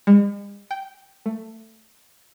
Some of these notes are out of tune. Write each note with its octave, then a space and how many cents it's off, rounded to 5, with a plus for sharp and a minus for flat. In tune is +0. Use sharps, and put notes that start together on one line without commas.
G#3 -45
G5 -10
A3 +15